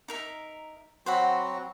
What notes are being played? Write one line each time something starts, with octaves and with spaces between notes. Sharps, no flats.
D#4 A#4 E5
F#3 C4 F#4 C5 F#5 B5